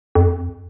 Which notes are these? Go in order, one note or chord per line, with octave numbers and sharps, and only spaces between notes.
F2